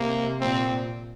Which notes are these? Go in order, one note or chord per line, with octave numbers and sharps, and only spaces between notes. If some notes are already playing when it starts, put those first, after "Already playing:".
Already playing: C3 A#3
A#2 C4